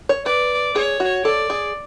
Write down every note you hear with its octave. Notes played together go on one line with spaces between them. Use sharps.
C#5
B4 D5
G#4 C#5
F#4
A4 D5
G#4